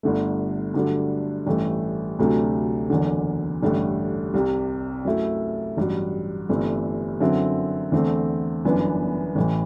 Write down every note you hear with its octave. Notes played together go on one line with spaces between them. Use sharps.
G1 G2 D3 A3
G2 D3 F#3 A3 D4
A1 G2 E3 A3
D2 C3 F#3 A3 D4
F#1 E2 D3
A1 G2 D3 A3
C2 C3 G3
F#2 F#3 A3 E4
A1 G2 F#3
G1 G2 E3 A3 C4
F#2 D3 F#3 C4 E4
E2 D3 A3 C4
G1 F#2 E3 B3 D4
A1 A2 E3